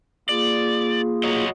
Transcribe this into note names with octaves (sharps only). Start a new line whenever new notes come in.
A#3 F4 G#4 D5
F#4 C#5 D#5